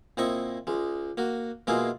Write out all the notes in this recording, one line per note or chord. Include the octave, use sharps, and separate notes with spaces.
A#2 C4 E4 D#5 C#6 D#6
C#2 G#3
A#3 F#4
B2 G#3 A#3 E4 F4 G#4